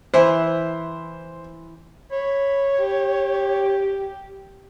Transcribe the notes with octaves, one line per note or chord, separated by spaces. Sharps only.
E3 E4 C5
C#5 B5
G4